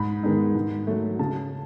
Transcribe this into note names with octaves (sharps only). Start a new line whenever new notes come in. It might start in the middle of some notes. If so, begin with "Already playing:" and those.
Already playing: G#2 B5
D#3 G#3 B3 D#4
G#2
F#3 A3
C#3 A5